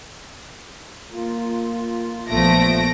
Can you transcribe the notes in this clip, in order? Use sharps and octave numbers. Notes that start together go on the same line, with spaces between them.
A#3 F4
A#1 F3 A3 B3 A#6 D7